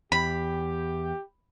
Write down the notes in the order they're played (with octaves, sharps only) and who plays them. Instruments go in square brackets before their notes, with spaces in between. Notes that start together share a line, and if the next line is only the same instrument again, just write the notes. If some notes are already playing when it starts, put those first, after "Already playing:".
[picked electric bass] E2 [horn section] G4 [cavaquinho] B5